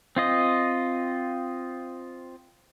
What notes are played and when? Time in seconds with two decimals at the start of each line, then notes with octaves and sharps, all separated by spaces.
0.16 C4 F4 D#5